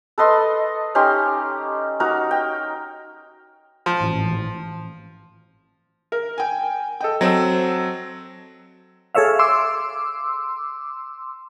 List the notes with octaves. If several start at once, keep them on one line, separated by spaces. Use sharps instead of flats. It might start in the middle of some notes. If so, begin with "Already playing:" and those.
A4 B4 D#5 C6
C#4 D#4 G4 C6
D#4 F#4 A#4
G5
F3
G#1 A2 E3
A#4
G5 G#5
A4 D#5 G5
F#3 C4 A4 D#5
G#4 A4 C#5 E5 F5
C6 D6 E6